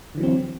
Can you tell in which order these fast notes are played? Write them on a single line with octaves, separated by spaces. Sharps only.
D3 E3 F#3 C4